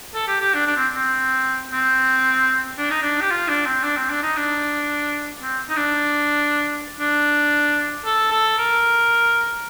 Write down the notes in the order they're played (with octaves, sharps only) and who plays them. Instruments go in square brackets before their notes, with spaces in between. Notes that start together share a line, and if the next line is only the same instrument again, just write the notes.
[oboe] A4
G4
G4
D4
D4
C4
C4
C4
D4
D#4
D4
G4
F4
D4
C4
D4
C4
D4
D#4
D4
C4
D#4
D4
D4
A4
A4
A#4